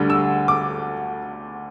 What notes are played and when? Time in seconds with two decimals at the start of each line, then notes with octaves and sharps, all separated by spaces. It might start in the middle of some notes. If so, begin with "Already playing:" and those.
Already playing: D2 D3 G3
0.10 E6
0.48 D6